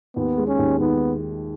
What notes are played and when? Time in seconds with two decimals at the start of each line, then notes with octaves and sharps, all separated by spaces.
0.16 D#2 B3
0.38 G#3
0.47 C#4
0.59 D#2
0.80 D#3 B3